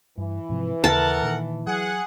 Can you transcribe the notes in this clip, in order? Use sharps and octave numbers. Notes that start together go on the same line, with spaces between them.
G2 E3
G#2 C3 F3
D#2 C#3 A4 A#4 F#5 A5
A#2 D#3
F#3 G#4 F#5